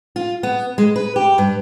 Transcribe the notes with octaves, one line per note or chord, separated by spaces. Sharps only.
F4
B3
G#3
B4
G4
G2